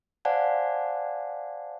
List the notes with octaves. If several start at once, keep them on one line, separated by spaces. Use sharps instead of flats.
C5 D5 F5 F#5 G#5 A5